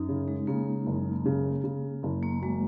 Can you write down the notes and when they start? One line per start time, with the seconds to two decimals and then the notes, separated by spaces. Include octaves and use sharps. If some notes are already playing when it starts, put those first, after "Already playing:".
Already playing: F#2 D#4
0.09 C#3
0.28 G#3
0.47 C#3 A#3
0.86 F#1
1.26 C#3
1.64 C#3
2.03 F#1
2.23 A#3
2.42 F#3 G#3